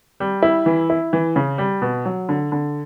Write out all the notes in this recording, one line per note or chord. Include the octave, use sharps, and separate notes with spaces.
G3
E4
E3
E4
E3
C#3
G3
B2
F#3
D3
D3